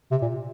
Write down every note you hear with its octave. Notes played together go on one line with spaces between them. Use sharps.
C3
A#2